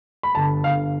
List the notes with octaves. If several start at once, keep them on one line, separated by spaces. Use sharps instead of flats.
B5
G1 A5
G1 F5